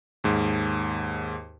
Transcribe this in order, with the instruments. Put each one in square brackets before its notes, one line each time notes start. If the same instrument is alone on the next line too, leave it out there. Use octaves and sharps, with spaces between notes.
[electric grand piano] D#2 G#2